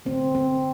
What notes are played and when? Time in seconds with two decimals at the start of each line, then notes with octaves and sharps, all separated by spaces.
0.06 D3 A3 C4
0.35 C4